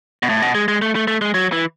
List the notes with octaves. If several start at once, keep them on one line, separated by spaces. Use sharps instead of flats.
B2
A2
B2
G#3
G#3
A3
A3
A3
G#3
F#3
E3